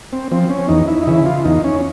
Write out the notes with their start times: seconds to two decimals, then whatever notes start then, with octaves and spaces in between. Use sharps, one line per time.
0.13 C4
0.31 F3 C4
0.50 C#4
0.69 E2 D#4
0.88 E4
1.03 D#4
1.07 C#3 E3 E4
1.26 F4
1.45 E2 D#4
1.64 C#4